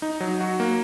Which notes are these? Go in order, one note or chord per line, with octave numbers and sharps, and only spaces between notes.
D#4
F#3
F#4
A#3